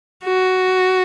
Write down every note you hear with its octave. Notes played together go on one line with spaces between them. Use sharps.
F#4